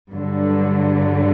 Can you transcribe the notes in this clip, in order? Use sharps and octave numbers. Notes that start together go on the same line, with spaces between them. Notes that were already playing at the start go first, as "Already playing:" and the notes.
G2 D3 F#3